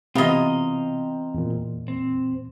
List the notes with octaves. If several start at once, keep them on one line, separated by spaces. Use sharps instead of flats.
C3 E3 B3 C4 F4 D#5 A#5 C6
E2 A#2
C4